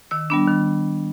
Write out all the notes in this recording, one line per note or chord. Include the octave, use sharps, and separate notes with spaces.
D#3 E6
G3 B3 D4
D#3